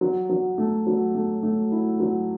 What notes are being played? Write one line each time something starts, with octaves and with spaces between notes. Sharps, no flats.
F#3
F#3
A3
F#3
A3
A3
E4
F#3